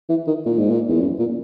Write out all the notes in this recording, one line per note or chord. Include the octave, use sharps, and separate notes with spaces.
E3
D#3
A#2
G#2
A#2
E2
F#2
A#2